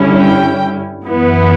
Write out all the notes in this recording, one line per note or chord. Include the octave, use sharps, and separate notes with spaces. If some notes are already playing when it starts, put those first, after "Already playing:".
Already playing: G2 D3 G3 C#4 E4
G5
F#2 E3 B3 E4